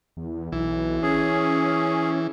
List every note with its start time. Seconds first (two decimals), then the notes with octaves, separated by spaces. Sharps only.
0.17 E2
0.52 B1 E3
1.03 C#4 G#4